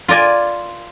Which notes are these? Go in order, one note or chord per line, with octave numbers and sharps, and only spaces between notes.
F4 A#4 D5 G#5